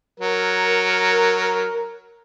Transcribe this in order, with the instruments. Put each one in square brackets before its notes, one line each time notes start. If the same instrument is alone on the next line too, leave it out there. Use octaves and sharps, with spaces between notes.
[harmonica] F#3 [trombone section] A#4